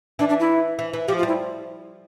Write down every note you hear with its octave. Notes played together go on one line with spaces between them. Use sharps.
E3 D4
D4
E4
E3
E3
F3 G4
F4
G3 E4